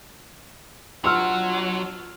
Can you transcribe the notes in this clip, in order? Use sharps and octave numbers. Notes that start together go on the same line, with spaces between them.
B2 F#3 D4 F4 C6 E6 F6